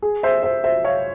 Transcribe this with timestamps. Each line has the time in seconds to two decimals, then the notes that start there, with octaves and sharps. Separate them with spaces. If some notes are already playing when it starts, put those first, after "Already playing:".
0.02 G#4
0.23 C5 E5
0.43 C5 E5
0.64 C5 E5
0.85 C#5 F5